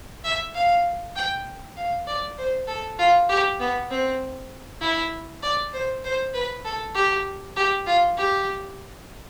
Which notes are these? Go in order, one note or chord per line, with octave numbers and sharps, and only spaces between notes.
E5
F5
G5
F5
D5
C5
A4
F4
G4
B3
C4
E4
D5
C5
C5
B4
A4
G4
G4
F4
G4